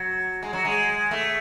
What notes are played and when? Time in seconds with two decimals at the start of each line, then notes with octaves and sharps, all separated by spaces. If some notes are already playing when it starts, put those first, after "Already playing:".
Already playing: F#3
0.43 G#3
0.53 F#3
0.65 G#3
1.11 A3